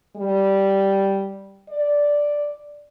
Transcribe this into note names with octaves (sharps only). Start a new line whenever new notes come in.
G3
D5